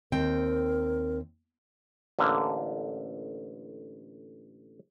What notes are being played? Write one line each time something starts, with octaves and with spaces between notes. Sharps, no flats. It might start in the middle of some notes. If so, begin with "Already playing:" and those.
D#2 C4 A#4 G5
A1 D3 A#3